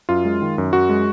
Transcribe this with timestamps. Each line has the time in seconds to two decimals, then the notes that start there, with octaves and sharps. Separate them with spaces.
0.09 F#2 F4
0.25 G#3
0.42 D#3
0.58 F#2
0.73 F#2 F#4
0.89 G#3